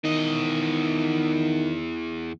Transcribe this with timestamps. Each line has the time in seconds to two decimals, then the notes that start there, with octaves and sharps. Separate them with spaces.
0.04 E2 D#3 D#5